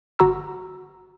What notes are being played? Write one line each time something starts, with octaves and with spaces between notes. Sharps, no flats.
G1 F#4 A#5 E6